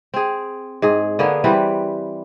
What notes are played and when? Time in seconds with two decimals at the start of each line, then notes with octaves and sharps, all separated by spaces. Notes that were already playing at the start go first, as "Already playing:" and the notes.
0.14 C4 G#4
0.82 G#2 G#4
1.19 D3 A#3 B3 G#4
1.44 E3 G3 C4 B4